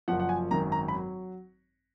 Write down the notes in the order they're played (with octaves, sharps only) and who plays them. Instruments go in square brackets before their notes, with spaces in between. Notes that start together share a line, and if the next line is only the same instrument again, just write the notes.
[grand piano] F#1 F#2 F3 F#5
F#5
G#5
G#1 F#2 D#3 A#5
A#5
B5
F#3